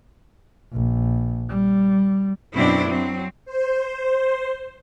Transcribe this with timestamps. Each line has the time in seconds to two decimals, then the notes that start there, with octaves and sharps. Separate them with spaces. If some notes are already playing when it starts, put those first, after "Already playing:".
0.73 A#1
1.50 G3
2.56 F#2 B2 C4 D4 E4
2.89 F#3 C4
3.45 C5